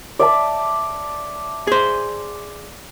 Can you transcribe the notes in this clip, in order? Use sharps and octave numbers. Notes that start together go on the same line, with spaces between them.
D5 E5 A5
G#4 C5